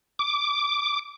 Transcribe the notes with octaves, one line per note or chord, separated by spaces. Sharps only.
D6